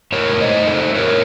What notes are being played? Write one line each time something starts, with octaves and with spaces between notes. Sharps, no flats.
A2 A#4 C#5
A3
C5 D#5
D#4
A4 C5
A3
A2 A#4 C#5